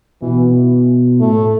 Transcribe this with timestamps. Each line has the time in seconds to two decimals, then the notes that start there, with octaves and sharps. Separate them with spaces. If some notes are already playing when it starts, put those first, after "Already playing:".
0.22 B2 E3
1.20 A2 A3